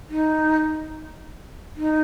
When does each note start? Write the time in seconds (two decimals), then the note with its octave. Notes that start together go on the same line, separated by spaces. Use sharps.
0.10 D#4
1.76 D#4